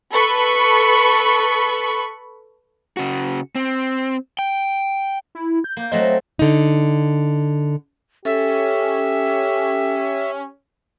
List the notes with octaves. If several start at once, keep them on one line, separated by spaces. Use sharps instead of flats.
A4 B4 B5 C#6
C#3 F#4
C4
G5
E4
G6
A#3
F#3 A3 C4 D#5
D3 D#4
C#4 G4 A4 E5